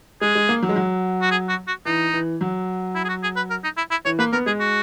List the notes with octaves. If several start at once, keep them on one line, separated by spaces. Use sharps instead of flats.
G#3 G#4
G#3
A#3
F#3
G#3
F#3
F#4
G#4
F#4
F#4
E3 D#4
E3
F#3
E4
G#4
F#4
G#4
B4
A#4
D#4
E4
E4
E3 C#5
A#3 B4
B3 A#4
G#3 G#4
F#4